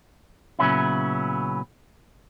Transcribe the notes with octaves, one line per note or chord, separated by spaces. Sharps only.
A#2 C#3 F#3 B3 C#4 E4